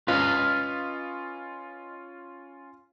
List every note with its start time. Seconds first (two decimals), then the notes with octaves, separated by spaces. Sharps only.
0.08 C#4 F4 B4 D#5 F5